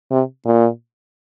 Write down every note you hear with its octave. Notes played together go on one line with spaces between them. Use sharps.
C3
A#2